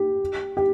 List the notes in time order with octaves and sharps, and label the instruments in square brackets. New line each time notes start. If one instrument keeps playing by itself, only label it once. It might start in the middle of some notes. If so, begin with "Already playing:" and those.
Already playing: [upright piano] G4
G4